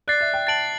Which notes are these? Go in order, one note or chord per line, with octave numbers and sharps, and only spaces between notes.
D5 F#6 A6 C7
E5
G5
A5 A6 D7 F#7